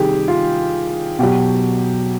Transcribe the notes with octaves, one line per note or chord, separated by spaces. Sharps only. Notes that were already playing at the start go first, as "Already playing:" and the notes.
Already playing: C3 D#3 G3 G4 G#4
F4
B2 F#3 G4